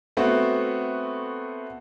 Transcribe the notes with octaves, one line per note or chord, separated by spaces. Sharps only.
A3 B3 C4 F#4